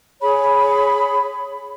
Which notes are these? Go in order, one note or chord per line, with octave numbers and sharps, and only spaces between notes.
G#4 C#5 B5